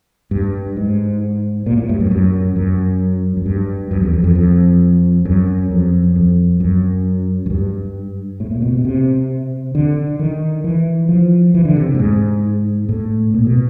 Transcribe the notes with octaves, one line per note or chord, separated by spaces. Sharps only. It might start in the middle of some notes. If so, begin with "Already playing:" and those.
G2
G#2
A#2
A2
G2
F#2
F#2
F#2
F#2
G2
F#2
E2
F2
F2
F2
F#2
F2
F2
F#2
F#2
G2
A2
A#2
B2
B2
C3
D3
D#3
E3
F3
E3
D3
C3
A2
G#2
A2
A#2
B2